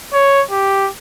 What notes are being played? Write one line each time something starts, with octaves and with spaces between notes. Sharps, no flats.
C#5
G4